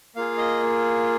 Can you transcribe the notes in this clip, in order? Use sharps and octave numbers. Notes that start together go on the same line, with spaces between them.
A#3 F4 G#4 F5
D#5